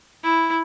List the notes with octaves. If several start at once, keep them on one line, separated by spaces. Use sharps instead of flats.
E4